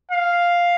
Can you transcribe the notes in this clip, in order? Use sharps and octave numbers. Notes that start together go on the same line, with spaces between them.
F5